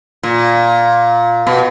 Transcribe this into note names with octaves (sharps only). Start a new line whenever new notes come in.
A#2
B2